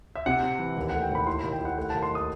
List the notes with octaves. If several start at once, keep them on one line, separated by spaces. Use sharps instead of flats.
E5
C3 F#5
C3
E3
D#2
A3 F#5
G5
D#2 B5
E4 C6
D#2 B5
G5
E4 F#5
A3 F#5
D#2 A5
C6
D#3 D#6